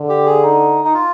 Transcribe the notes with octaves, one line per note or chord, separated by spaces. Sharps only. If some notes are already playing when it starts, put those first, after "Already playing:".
Already playing: D3
G4
G#4
D#4
D#4
F4